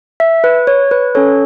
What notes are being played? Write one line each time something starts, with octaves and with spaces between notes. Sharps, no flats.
E5
B4
C#5
B4
C#4 A4 C#5